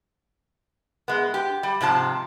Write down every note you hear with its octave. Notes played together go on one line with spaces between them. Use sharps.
G#3 B3
G4
G3
G#2 C3 F3 A5